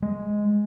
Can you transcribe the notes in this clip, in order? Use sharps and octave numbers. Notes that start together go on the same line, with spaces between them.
G#3